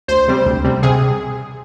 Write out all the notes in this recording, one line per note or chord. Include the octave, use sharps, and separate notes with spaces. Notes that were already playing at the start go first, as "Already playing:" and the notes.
D2 C5
C3 G3 C4
D2
C3 G3 C4
C3 G#4